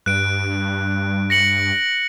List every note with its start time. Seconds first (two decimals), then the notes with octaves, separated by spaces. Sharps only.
0.06 G2 F#6 D7
1.30 A#6 C#7 F#7